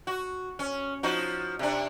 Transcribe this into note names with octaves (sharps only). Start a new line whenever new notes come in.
F#4
C#4
F3 D#4 F#4
C3 D4